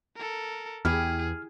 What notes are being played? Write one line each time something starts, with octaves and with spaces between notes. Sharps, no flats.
A4 A#4
E2 E4 G4 G#4 F6